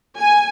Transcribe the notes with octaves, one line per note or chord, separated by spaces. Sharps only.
G#5